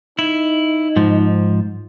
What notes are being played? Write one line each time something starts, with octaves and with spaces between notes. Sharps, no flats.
D#4 E4
G#2 F3